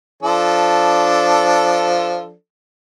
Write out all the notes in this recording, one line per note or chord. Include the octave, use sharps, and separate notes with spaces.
F3 D4 A4